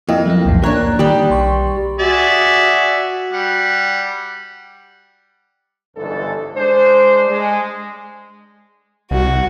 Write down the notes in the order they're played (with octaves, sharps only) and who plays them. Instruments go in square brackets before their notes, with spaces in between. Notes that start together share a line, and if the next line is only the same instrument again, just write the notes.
[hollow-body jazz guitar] F2 [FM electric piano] A#3 E4 D#5
[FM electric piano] F3 F#3 A#3
B1 E2 A2
[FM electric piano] A#3 A#5 F#6 [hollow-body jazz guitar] D4 C#5
[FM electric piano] D#3 [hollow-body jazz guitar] G3 G4
[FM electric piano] B1 C6 C#6
[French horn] F#4 [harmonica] G#4 D5 E5
[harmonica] G3 F#5
[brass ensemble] G1 C#2 G#2 E3 D4 A4
G#3 D4 C5
G#3
[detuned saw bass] C2 [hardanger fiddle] F#4